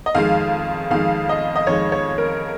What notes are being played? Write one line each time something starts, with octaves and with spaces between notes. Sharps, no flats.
D#5
F2 D#3 G#3 F5
F2 D#3 G#3 F5
D#5
D#5
F2 D#3 G#3 C#5
C#5
A#4